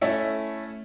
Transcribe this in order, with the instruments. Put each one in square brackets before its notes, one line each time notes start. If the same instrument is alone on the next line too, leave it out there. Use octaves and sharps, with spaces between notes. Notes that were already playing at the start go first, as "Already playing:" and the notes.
[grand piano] A3 C#4 E4 A4